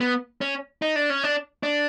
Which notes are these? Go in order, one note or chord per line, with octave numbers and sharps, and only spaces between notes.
B3
C#4
D#4
D4
C#4
D4
D4